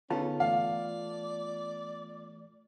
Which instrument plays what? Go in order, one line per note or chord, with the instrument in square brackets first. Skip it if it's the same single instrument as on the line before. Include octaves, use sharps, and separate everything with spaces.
[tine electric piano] D3 D#4 G#4 [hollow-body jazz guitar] B3 F4 A4 [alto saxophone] C#4
[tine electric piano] E3 A3 [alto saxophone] D5 [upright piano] F5